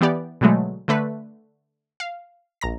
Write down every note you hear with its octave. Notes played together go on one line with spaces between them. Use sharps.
E3 B3 G4 D5
B2 D3 F#3 G#3 A3
D3 A3 B4 B6
F5
A#1 A#5 A#6